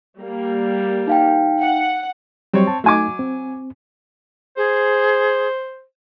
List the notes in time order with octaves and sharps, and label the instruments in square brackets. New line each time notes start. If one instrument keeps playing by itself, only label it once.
[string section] G3 A#3
[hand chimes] D#4 F5 G5
[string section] F#5
[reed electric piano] F#3 G3 [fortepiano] C4 C#5
[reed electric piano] A5
[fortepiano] F#3 G#5 D6 [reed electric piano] A3 D#4
[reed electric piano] C4
[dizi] G#4 [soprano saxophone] C5